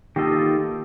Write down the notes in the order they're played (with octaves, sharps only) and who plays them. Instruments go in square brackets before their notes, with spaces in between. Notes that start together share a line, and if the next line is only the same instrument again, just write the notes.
[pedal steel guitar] D#3 A#3 F4 A4 D#5 [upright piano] G4